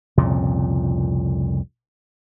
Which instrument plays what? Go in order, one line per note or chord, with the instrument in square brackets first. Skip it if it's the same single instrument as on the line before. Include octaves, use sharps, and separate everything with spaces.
[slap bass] C2 F2 A#2 C#3